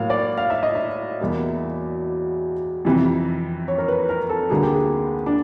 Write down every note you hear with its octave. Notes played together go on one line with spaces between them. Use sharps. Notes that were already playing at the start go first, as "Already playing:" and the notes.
Already playing: A2 F#3 A#3 F5
D5
F5
E5
D#5
E5
E2 B2 G3 A#3
F2 C3 E3 G3
C#5
A#4
B4
A#4
A4
D2 D3 G3 A#3 G#4
G4
G#4
D4